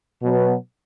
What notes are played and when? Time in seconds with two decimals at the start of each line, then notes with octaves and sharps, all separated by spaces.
0.23 B2 F#3 B3